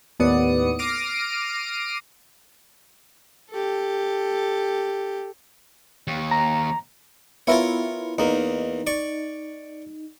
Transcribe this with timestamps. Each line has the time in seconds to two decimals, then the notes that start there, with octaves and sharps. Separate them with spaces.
0.19 D#2 A2 B3 D5 D#6 C#7
0.79 D6 F6 A#6 C7 D7 D#7
3.50 G4 A4
6.07 D#2
6.31 A#5
7.47 B3 E4 F4 A#4 C#5
8.19 E2 A#3 D#4
8.87 D5 C#6